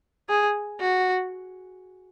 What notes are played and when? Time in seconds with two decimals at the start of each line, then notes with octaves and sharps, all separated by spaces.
0.29 G#4
0.80 F#4